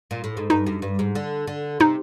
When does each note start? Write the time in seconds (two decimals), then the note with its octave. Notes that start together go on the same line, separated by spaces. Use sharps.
0.11 A#2
0.24 A2
0.37 G#2
0.50 G2 D#4
0.67 F#2
0.82 G2
0.99 G#2
1.15 D3
1.47 D3
1.80 C3 D#4